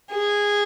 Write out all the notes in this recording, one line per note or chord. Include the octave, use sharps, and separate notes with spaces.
G#4